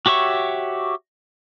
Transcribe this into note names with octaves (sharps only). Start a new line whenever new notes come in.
F#4 G4 C#5 E5 C#6